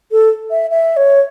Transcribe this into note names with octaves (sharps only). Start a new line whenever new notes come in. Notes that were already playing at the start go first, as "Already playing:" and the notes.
A4
E5
E5
C#5